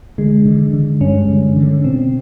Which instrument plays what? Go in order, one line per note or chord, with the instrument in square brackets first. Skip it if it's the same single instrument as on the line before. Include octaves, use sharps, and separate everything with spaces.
[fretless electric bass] D3 [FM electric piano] G#3
[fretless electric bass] D3
D3
[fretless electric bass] G2 [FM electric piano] C#4
[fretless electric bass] D3
D3
[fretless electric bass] B2 [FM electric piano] C4